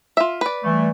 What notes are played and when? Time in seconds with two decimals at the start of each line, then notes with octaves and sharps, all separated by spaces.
0.17 F4 E5
0.41 B4 D5
0.64 E3 G3 A3